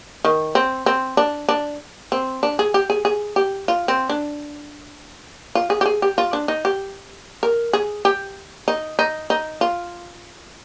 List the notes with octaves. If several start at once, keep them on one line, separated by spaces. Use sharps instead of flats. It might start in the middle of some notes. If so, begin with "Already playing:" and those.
D#3
C4
C4
D4
D4
C4
D4
G#4
G4
G#4
G#4
G4
F4
C4
D4
F4
G#4
G4
G#4
G4
F4
D4
D#4
G4
A#4
G#4
G4
D#4
D#4
D#4
F4